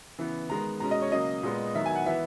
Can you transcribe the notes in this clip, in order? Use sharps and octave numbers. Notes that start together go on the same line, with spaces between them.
C#3 E3 B3
D#3 G#3 B3 A#5
B2 G#3 C#4 A#5
D#5
C#5
C#3 F#3 A#3 D#5
A#2 G#3 B3
D#3 F#3 B3 E5
G#5
F#5
E3 B3 E5